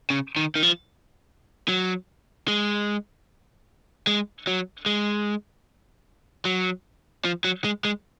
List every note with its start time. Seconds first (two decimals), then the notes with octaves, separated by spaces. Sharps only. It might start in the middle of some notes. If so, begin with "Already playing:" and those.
0.10 C#3
0.36 D#3
0.55 D#3
0.63 F3
1.68 F#3
2.48 G#3
4.07 G#3
4.47 F#3
4.86 G#3
6.45 F#3
7.25 F3
7.44 F#3
7.64 G#3
7.85 G#3